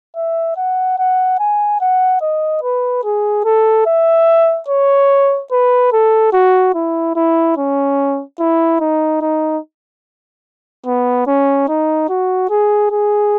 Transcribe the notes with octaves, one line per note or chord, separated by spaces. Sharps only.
E5
F#5
F#5
G#5
F#5
D#5
B4
G#4
A4
E5
C#5
B4
A4
F#4
E4
E4
C#4
E4
D#4
D#4
B3
C#4
D#4
F#4
G#4
G#4